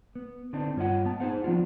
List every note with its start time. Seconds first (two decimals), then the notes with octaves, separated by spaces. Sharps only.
0.15 B3
0.53 D3 B3 C4 D4 D#4
0.76 G2 F4 C#5 D#5 F#5
1.05 B3 A5
1.20 D#4 G#4 C5 F#5
1.44 F3 B3 D4 F4